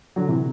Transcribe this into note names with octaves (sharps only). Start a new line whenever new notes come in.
D3 F#3
C3 E3